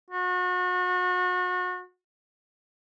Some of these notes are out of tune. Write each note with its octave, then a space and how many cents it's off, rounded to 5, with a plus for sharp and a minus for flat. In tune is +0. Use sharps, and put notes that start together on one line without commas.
F#4 -35